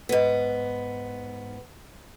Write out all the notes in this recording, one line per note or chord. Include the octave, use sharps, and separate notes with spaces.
G#2 B3